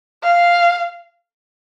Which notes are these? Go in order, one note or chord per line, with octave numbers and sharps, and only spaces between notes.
F5